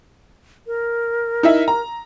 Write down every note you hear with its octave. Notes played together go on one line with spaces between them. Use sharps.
A#4
D#4 E4 E5
A#5